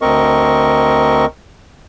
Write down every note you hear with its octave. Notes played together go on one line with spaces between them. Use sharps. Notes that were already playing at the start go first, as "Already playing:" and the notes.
D2 C4 A#4 D#5 C#6